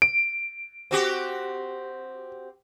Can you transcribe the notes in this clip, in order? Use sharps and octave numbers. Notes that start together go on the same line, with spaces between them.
D7
C4 F#4 G4